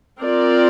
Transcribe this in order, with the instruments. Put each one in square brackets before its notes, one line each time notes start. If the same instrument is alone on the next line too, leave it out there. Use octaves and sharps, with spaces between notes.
[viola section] C4 F4 A#4 D5